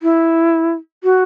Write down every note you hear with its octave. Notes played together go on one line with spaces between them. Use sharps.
E4
F#4